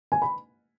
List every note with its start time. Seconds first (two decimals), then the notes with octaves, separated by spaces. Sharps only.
0.12 G#5
0.22 B5